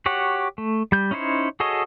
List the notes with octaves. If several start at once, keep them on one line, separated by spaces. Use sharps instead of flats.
F#4 G4 C#5 F#5
A3
G3 G6
C#4 D#4 E4 C5 C#5
F#4 G#4 A4 C#5 D#5